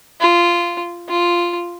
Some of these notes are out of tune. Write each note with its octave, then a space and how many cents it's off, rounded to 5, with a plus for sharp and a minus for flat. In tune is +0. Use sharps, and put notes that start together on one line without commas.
F4 -15
F4 -5